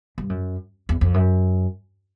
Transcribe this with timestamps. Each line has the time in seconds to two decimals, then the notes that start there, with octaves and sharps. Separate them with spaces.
0.18 G2
0.29 F#2
0.89 E2
1.01 F2
1.14 F#2